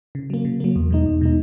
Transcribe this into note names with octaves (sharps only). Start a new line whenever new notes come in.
C#3
F#3 A#3
C#3
F#3 A#3
E2
B2 G#3 D#4
E2
B2 G#3 D#4